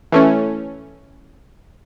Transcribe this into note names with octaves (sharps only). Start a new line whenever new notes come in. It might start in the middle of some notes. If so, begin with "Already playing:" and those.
E3 A3 C#4